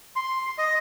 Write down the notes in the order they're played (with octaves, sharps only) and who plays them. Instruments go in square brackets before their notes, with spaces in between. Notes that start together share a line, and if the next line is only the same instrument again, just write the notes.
[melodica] C6
D#5